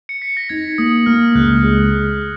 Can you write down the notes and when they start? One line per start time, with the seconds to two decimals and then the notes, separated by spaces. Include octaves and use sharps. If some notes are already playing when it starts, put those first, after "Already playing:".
0.09 C#7
0.22 B6
0.37 A#6
0.49 D#4 G#6
0.78 A#3 D#6
1.06 A#3 F6
1.35 C#2 F#6
1.63 G#3